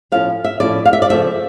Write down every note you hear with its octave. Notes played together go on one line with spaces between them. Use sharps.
A2 F3 C#4 F5
E5
A2 F3 C#4 D5
F5
E5
D5
C#3 F3 A3 E5